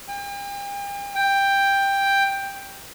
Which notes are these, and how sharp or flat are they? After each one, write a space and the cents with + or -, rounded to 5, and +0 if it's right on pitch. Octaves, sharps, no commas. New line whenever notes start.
G5 +40
G5 +10